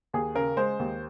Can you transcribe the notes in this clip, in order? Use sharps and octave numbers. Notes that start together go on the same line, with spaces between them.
D#2 G#4
C#3 A#4
G#3 C5
D#2